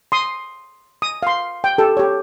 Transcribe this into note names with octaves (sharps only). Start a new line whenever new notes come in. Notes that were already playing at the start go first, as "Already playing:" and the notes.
C6 D#6
D#6
F5 C6
G5
G4 A4
G4 C#5